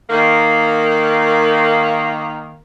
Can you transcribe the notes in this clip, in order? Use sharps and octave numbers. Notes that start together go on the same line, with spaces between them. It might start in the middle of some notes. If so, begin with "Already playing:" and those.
D#3 A#3